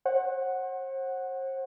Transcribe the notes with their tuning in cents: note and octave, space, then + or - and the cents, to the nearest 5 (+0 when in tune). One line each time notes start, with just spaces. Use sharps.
C5 +40 F#5 +0